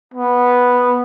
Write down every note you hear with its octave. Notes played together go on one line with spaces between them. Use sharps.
B3